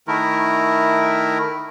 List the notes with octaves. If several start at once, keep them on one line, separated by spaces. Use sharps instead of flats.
D#3 A3 E4 A#4